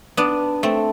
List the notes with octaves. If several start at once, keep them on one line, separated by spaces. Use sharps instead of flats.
B3 D4
A3 C4